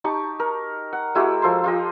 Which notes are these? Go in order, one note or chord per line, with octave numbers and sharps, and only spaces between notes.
D#4 G4 A5 C#6
A#4
F#5
G#3 E4 F#4 G4
F3 A4 C5 C6
F4 G4 D#5